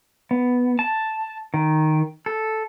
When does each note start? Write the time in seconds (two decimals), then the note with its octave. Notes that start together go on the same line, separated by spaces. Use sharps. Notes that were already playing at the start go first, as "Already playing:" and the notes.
0.31 B3
0.79 A5
1.54 D#3
2.26 A4